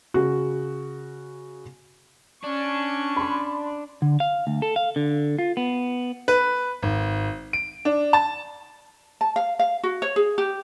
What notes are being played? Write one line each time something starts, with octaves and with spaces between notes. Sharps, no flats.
C#3 F#4
C#4 D4 C#6
B5 C6
D3
F5
D2
A4
F5
D3
F4
B3
B4
G#1
D7
D4
A5
A5
F5
F5
F#4
C#5
G#4
G4